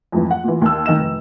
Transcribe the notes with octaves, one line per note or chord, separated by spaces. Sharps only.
F2 G#2 E3
F#5
A#2 E3
D#2 E6
D#3 D#5 E7
F1